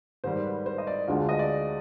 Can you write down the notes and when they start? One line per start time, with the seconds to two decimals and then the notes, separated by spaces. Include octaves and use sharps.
0.24 G#2 D#3 G3 C5
0.45 B4
0.66 C5
0.78 D#5
0.87 D5
1.08 D2 D3 G#3 F4
1.29 D#5
1.39 D5